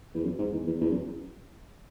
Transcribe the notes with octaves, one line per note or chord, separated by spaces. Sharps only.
E2
F#2
G#2
E2
E2
E2
F#2